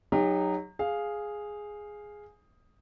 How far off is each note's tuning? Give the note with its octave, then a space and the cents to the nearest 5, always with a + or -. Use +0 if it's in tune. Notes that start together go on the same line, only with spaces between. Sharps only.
F#3 +0 D#4 -10 G4 +35
G#4 +0 F5 +0